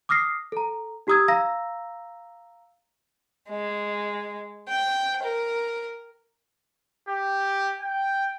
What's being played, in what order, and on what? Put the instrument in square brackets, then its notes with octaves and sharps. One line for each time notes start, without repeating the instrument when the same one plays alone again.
[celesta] D6 D#6 F6 A#6 C7
A4 A#5
D#4 G4 A#5 D#6 E6 G#6
F5 A#5 E6 A#6
[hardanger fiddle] G#3
G5
A#4
[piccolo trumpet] G4
G5